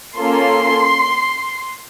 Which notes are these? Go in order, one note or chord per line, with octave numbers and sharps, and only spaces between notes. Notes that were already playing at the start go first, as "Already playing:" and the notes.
A#3 C#4 F4 A4 C6